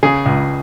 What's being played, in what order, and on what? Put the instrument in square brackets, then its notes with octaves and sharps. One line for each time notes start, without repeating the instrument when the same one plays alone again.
[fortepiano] C#3 G#4
C#2